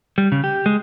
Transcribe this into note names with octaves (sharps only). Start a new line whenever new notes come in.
G3
C#3
G4
G#3